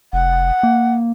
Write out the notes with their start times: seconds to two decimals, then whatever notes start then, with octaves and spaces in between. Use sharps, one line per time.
0.13 F1 F#5
0.63 A#3